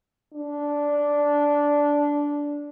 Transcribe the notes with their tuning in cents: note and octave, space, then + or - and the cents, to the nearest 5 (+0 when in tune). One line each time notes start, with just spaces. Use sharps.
D4 -10